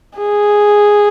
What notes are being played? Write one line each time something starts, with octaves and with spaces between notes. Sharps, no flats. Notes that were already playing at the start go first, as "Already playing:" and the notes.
G#4